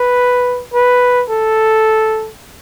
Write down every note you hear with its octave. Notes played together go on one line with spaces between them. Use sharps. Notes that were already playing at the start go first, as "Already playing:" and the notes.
Already playing: B4
B4
A4